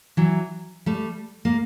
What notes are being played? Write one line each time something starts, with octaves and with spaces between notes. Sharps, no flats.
E3 F#3
G3 A3
A#3